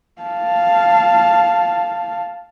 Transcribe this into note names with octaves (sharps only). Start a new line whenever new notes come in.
F5 A5